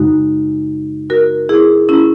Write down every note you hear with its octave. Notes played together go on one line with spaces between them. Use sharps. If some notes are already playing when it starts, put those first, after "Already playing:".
Already playing: F#2 C#3 G#3 D#4 F#4
F#4 A#4
E4 G#4
C#4 E4